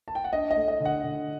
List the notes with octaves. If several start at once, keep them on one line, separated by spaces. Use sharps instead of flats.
A5
G5
F#5
D4 D#5
D#5
A3
D#5
D3
F#5
D3